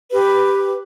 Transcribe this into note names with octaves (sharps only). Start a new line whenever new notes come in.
G4 B4